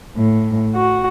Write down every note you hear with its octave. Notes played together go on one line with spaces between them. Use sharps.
A2
F#4